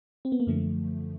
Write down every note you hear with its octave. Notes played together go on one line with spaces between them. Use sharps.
C4
B3
A#3
F#2 D3 F3 A3